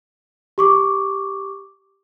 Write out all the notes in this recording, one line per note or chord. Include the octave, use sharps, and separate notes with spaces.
G4 C#6 D6